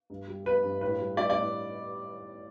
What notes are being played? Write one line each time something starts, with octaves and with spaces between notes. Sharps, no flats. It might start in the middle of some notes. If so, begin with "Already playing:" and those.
G2
G3
G3 B4
G2
A2 B4
G3
G3 D5
D5
A2